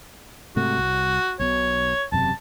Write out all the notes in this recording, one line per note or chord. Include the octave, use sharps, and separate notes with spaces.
G#2 C3 A3 F#4
C2
B1 B2 C#5
E1 F#2 C3 A5